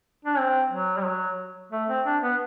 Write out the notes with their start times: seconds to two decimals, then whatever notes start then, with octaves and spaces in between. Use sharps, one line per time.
0.25 D4
0.39 C4
0.71 F#3
0.98 G3
1.05 F#3
1.72 A3
1.89 C4
2.06 D4
2.23 B3